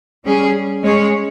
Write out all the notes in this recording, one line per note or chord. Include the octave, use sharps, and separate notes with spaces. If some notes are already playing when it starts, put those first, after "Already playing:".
G3 C#4 G#4
G#3 C#4 G#4 C#5